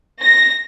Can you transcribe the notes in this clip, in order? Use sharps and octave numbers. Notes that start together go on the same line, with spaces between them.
A#6